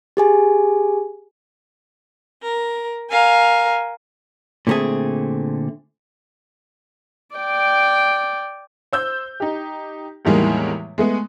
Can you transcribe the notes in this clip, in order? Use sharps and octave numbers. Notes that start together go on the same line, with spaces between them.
G4 G#4 G#5
A#4
A#4 F5 G#5
A#2 D3 A3 C4 G#4
D5 G5
C5 E6 G6
D#4 G4
E2 A2 D#3 G3 G#3 A#3
G#3 A3 B3